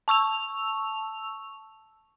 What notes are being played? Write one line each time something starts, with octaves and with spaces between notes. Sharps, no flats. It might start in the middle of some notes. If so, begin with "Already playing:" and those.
A5 C#6 E6 F7